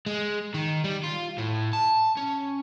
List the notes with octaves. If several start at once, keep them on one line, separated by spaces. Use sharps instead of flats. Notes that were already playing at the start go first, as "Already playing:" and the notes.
G#3
D#3
G3
F4
A2
A5
C#4